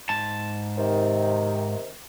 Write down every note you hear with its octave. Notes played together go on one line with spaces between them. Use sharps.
G#2 A5
C3 D#3